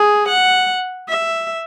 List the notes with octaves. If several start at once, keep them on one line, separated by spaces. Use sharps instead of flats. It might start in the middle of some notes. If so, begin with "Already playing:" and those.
Already playing: G#4
F#5
E5